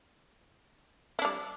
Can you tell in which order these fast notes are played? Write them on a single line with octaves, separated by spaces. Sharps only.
E4 D4 G3